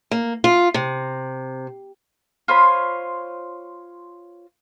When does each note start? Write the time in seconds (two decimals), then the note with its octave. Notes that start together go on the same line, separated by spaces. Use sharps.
0.11 A#3
0.44 F4
0.74 C3
2.48 F4 C5 C#5 B5